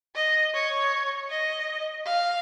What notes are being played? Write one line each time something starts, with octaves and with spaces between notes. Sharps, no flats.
D#5
C#5
D#5
F5